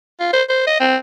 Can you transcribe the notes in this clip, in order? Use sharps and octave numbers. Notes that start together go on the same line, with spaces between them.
F4
C5
C5
D#5
C4